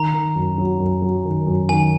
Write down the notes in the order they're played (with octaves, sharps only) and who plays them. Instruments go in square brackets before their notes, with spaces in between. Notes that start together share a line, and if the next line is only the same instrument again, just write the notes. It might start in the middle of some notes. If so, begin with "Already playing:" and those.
Already playing: [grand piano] D#3 [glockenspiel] A#5
[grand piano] D#3
F#2
F#3
F#2
F#3
D#3
F#2
[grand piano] D#3 [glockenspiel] G#5